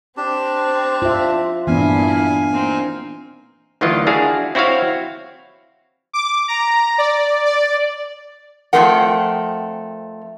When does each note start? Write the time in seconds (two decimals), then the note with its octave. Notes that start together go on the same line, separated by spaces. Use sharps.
0.17 C4 D4 G4 A5
1.02 F4 E5
1.67 G2 A#2 E3 B3 D4 E4 F5 G#5
2.51 A#3 C4 D#4
3.81 D2 D#3 E3 F#3 F4 D#5
4.07 D4 E4 F#4 G#4 F5
4.55 C4 E4 F#4 C#5 F5
6.13 D6
6.48 A#5
6.98 D5
7.45 D5
8.73 F2 G#2 A3 C4 A#4 F#5